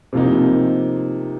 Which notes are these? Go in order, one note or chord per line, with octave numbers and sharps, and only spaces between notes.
C3 F3 A#3 D#4